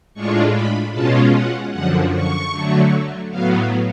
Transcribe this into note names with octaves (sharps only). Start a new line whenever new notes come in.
A2 G#3 D4 F4 C#6
B5
B2 G#3 C#4 F4 A5
F#5
F#2 D3 F3 F#5
C#6
D3 F#3 A3
A2 F#3 B3 F5